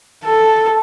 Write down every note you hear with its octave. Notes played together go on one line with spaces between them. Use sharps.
A4